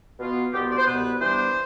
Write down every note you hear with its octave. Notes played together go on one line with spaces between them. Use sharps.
B2 B3 F4
C2 B2 B3 F4 G4
D5
C5
C2 B2 B3 B4
G2 E3 G3 B3 D4 C5